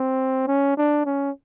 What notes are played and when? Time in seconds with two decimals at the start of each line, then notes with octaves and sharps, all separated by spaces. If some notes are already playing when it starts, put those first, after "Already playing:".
Already playing: C4
0.48 C#4
0.77 D4
1.06 C#4